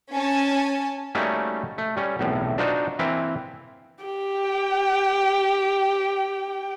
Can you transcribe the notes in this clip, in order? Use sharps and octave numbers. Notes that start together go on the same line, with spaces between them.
C#4 G#5 A5
G3 A3 A#3 C#4 D#4 F#4
A3
G3 C#4
B1 E2 A2 C3
D4 D#4 F4 F#4 C5
E3 A#3 C4 B4 E5 F5
G4 G5